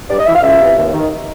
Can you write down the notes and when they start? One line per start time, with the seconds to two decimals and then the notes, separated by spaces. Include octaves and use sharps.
0.10 G2 D5
0.19 D#5
0.27 E3 E5
0.35 F5
0.43 C#2 E5
0.60 C3 E3
0.77 D#2
0.93 D#3